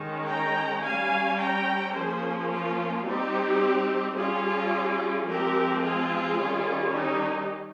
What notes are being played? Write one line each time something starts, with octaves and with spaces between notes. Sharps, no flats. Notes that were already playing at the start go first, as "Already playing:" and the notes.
Already playing: D#3 G#3 C#4
G5 A#5
G3 C#4 F5 G#5
G5 A#5
F3 A#3 C#4 G#4 C5
F4
G3 C4 D#4 G4
G3 C#4 F4 G#4
F3 G#3 C4 G4 A#4
F4 G#4
D#3 G3 C#4
D#4 G4